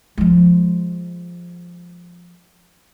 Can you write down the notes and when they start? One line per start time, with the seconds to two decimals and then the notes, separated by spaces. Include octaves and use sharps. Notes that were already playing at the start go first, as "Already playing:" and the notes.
0.18 F3 G#3